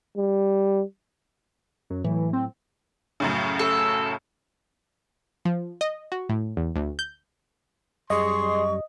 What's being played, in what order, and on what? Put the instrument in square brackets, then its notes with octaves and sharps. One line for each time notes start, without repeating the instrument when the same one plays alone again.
[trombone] G3
[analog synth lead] F#2
[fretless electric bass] A2 F#3 [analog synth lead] E3
[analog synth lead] C4
[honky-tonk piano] F#2 A2 C#3
[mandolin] A4
[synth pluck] F3
D#5
F#4
A2
E2
D2
G6
[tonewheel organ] F#2 G3 [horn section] G#4 C6 [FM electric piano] D#5 [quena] C#6